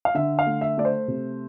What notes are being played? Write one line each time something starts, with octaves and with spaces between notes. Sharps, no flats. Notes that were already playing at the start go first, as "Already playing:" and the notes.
F5
D3 E5
F5
A3
E5
A3 D5
C5
C3